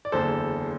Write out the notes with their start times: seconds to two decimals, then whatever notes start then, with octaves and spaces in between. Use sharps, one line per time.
0.05 D5
0.12 F#1 E2 D3 A4 C5